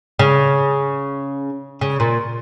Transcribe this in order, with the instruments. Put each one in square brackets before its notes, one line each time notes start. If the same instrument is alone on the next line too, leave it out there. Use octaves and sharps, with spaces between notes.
[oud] C#3
C#3
A#2